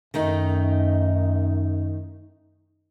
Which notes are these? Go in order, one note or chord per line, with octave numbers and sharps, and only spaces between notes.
F#2 D#3 A3 D#4